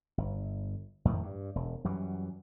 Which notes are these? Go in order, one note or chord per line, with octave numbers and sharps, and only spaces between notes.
G1
F2 A2 D#3
G2
E1
F#2 E3 F#3 G3